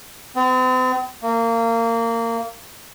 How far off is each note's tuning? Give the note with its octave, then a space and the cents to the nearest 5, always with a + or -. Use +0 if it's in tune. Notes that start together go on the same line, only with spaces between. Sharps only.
C4 -40
A#3 -25